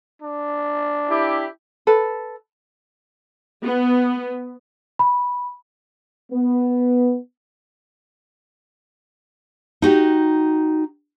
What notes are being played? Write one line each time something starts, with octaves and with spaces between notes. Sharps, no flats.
D4
E4 G4
A4 B4
B3
B5
B3
D#4 F#4 G4